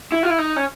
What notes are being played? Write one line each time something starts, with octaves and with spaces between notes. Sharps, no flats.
E4
F4
E4
D#4
C#4